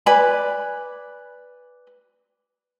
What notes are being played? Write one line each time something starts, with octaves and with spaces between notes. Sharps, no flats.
B4 D5 G#5 B5